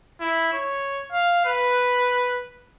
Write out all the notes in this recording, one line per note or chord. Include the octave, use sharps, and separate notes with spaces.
E4
C#5
F5
B4